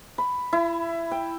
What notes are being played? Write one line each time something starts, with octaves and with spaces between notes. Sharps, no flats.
B5
E4
G5